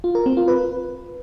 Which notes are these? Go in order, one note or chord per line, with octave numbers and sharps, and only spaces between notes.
F4
A#4
C4
F4
B4